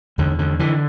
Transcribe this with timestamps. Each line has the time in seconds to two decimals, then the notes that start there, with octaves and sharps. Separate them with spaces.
0.18 E2 D3
0.39 D3
0.59 D3 E3